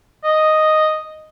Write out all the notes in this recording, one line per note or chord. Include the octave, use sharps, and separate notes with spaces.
D#5